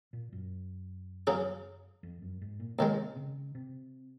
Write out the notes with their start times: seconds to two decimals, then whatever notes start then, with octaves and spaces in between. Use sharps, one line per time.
0.13 A#2
0.32 F#2
1.27 C#3 F#3 C#4 G#4
2.03 F2
2.22 F#2
2.41 G#2
2.60 A#2
2.78 D#2 C3 D#3 G#3
3.16 C#3
3.55 C3